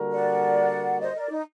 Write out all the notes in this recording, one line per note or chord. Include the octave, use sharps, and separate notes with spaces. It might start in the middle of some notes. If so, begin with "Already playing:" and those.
Already playing: D3 G3 A#3 F#4 A#4
D5 F#5
C5 D#5
A#4 D5
D#4